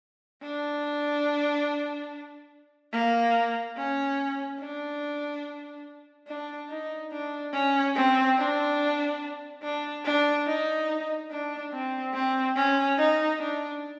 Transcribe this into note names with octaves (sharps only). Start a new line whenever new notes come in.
D4
A#3
C#4
D4
D4
D#4
D4
C#4
C4
D4
D4
D4
D#4
D4
C4
C4
C#4
D#4
D4